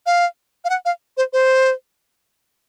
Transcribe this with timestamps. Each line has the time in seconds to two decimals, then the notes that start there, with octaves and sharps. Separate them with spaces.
0.06 F5
0.65 F5
0.70 F#5
0.85 F5
1.17 C5
1.33 C5